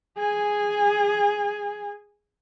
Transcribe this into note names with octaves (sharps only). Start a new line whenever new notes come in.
G#4 G#5